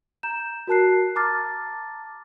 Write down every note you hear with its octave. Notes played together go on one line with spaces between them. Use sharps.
A#5 G6 E7
F#4 A#4 A5 F#6 C7
A5 A#5 D6 F6 A6